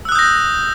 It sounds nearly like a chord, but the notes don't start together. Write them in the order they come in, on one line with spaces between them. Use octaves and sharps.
E6 F#6 D#6 G6 A#6